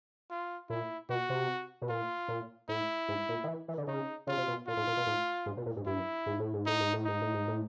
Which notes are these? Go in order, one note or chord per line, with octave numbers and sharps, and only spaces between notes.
F4
A#2 E4
B2 F#4
C3
B2
A#2 F4
A#2
A2 E4
G#2
A#2
D#3
E3
E3
D3
C#3 D#4
C#3 F4
C3
B2
A#2 F4
A2
A#2
B2
A2
G#2
B2
A#2
G#2
G2 E4
G#2
A2
G#2
A2 D#4
G#2
A2
G#2 D#4
A2
G#2
A2